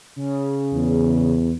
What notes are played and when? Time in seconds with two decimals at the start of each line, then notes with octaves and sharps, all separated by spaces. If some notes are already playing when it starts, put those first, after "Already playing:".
0.16 C#3
0.73 E2